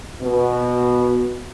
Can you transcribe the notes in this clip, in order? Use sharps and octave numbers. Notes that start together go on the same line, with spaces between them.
B2